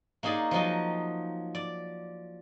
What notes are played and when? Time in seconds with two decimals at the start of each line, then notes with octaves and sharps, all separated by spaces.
0.23 A#3 C#4 D#4 G#4 D5
0.51 F3 F#3 D#4 D#5
1.55 D5